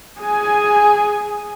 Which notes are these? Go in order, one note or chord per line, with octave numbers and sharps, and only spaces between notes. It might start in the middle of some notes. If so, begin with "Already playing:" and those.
G#4 G#5